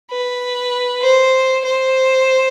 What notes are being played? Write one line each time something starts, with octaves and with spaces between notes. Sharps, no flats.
B4
C5
C5